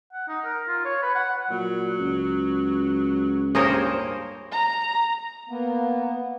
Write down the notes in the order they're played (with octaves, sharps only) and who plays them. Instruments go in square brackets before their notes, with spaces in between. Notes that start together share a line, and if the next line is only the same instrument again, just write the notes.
[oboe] F#5
D#4
A#4
F4
C#5
B4
F#5
[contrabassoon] A#2 [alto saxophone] F#3
[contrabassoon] C#2
[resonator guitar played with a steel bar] G2 A#3 C5 [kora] G#4 A#4 C#5
[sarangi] A#5
[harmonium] A#3 B3